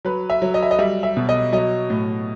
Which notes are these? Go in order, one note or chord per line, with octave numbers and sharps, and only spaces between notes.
F#3 B4
E5
F#3
D#5
E5
D#5
G3 E5
E5
B2
D#5
F#3 D#5
A2